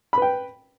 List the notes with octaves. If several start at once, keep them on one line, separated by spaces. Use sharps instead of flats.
B4 G5 B5